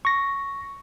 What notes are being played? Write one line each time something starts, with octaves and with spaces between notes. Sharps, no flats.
C#6 A#6